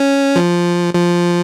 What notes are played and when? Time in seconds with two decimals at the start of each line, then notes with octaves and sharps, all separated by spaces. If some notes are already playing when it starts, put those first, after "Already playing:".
Already playing: C#4
0.36 F3
0.94 F3